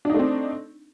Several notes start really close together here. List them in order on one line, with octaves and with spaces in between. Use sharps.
D4 D#4 A3 C4